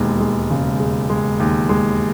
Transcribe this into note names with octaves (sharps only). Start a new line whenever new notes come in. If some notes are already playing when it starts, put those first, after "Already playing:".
Already playing: E1 D#2 G#3
G#3
C#3
G#3
G#3
D#2
G#3